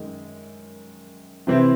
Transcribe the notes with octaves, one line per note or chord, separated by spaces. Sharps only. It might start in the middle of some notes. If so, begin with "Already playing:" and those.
Already playing: F#2 D#3 G#3
C3 E3 C4 E4